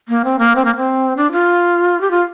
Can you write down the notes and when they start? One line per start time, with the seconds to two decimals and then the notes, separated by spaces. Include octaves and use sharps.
0.09 A#3
0.25 C4
0.39 A#3
0.56 C4
0.65 A#3
0.77 C4
1.17 D4
1.32 F4
2.01 G4
2.11 F4